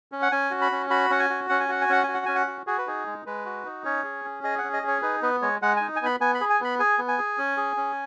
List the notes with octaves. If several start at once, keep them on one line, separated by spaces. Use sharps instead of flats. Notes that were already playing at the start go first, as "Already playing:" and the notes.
C#4
F#5
C#4 G#5
F#4
B5
C#4
F#4 B5
C#4 F#5
G#5
F#4
C#4 F#5
G#5
F#4 F#5
G#5
C#4 F#5
F#4 G#5
F#5
C#4 G#5
F#5
F#4
F#4 G#4
B4
D#4 G#4
G#3
G#3 B4
F#4
D#4
C#4 C#5
G#4
C#4
G#4 D#5
F#5
C#4
D#5
G#4 C#5
D#4 B4
B3 B4
G#3 C#5
G#3 F#5
D#4 G#5
G#5
B3 B5
B3 G#5
B5
G#4
G#5
B3 B5
G#4 G#5
B3
G#5
G#4
C#4
G#4
C#4